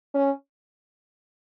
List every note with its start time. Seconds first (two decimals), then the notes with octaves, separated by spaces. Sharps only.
0.15 C#4